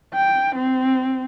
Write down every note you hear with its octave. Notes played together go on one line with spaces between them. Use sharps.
G5
C4